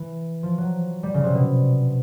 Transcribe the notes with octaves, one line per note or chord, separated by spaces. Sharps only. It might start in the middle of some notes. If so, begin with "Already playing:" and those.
Already playing: E3
F3
F#3
G3
C#3
C3
B2